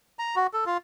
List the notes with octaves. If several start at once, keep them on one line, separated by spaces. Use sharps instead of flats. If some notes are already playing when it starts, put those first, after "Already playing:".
A#5
F#4
A4
F4